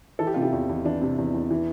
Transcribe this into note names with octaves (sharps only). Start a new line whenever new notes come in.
E3 A4
G4
C3 F4
E4 G4
E2
E2
E3 D4
C3
E2
E2
E3